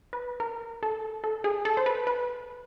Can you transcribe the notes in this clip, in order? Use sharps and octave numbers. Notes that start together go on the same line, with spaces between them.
B4
A#4
A4
A4
G#4
A4
C5
B4
B4